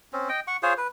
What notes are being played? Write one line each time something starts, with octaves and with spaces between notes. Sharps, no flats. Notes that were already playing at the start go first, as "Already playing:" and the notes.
C4 C#4
D#5 G5
F#5 C#6
F4 G#4 C5 C#5
B4